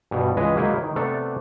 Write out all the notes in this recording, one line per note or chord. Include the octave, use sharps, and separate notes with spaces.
G2 B2 G3
C#2 E3 G#3 B4 D#5
F#3 G#3 A#3 D#4 E4 B4
D#3 D#4
C3 A3 B3 D4 A4